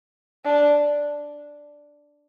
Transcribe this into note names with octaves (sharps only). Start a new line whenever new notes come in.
D4